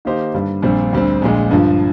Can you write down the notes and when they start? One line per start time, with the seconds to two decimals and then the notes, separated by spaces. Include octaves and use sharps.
0.05 D#3 A#3 D#4 G4 C5
0.34 G2 D3 G3
0.63 A#1 A#2 G3 C4
0.93 D2 D3 G3 C4
1.22 A#1 A#2 G#3
1.51 G2 D3 F3